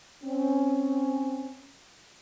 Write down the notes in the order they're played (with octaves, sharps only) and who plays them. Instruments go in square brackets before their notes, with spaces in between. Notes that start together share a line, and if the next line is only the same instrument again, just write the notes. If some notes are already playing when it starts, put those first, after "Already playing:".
[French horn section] C4 C#4